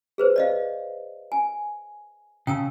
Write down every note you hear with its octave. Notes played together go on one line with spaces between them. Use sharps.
G#4 B4 C5
D5 D#5 F5
G#5
C#3 G5 A5 E6